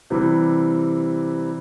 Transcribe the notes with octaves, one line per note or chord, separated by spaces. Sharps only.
C3 E3 G3